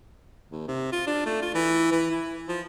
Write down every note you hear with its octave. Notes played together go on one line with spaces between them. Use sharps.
D#2
C3
F4
D4
A3
F4
E3
E3
E4
F3